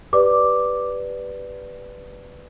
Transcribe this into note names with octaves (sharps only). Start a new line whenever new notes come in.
G4 B4 D5 D6